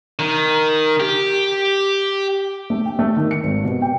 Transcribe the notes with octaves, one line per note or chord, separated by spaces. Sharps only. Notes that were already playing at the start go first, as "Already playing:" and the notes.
D#3
G4
A3
G5
A3
D#3
C#7
G#1
B2
G5